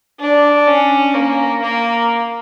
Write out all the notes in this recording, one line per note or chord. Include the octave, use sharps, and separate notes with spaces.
D4
C#4
A#3
A#3